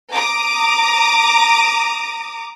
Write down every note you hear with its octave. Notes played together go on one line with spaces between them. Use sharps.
A#5 D6 D#6